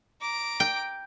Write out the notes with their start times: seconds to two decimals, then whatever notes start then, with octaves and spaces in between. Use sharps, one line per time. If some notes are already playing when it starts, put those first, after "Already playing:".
0.21 A#5 D6
0.60 G5